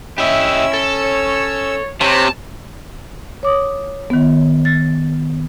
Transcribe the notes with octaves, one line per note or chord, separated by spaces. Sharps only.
C#4 E4 G4 D#5 E5 E6
A4
C#5
C3 C5 C#5 A5
C#5 D6 D#6
D#3 B3
A6